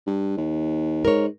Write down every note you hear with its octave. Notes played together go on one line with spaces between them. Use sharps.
G2
D#2
G#2 A#4 C#5